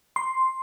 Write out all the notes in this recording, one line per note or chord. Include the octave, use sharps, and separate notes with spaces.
C6